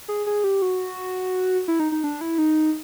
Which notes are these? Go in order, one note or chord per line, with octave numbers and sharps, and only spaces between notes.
G#4
G#4
G4
F#4
E4
D#4
D#4
D4
E4
D#4